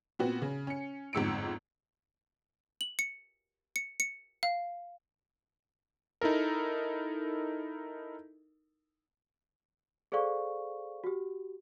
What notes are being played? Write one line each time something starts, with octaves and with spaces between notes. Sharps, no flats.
A#2 B3 C4 F#4
C#3
C#4 C#7
G1 F2 G#2 E6 C#7 D7
F#7
C#7
C#7
C#7
F5
D#4 E4 A4 A#4
G#4 A4 C5 D5 F5 C#6
F#4 G4